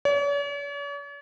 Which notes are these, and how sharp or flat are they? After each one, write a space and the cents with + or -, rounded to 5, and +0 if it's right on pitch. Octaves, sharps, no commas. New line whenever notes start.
C#5 +45